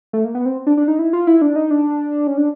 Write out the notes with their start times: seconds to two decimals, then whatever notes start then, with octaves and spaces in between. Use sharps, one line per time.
0.13 A3
0.24 A#3
0.35 B3
0.45 C4
0.67 D4
0.77 D4
0.88 D#4
0.99 E4
1.13 F4
1.27 E4
1.42 D4
1.56 D#4
1.71 D4
2.27 C#4
2.37 D4